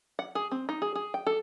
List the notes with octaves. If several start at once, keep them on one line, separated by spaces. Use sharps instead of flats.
F#5
G#4
C4
D#4
G#4
G#4
G5
A4